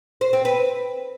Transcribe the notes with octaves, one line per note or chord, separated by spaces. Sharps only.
C5
C4
B4